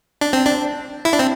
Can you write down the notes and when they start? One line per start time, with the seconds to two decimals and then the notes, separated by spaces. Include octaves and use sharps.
0.21 D4
0.33 C4
0.46 D4
1.05 E4
1.13 D4
1.19 C4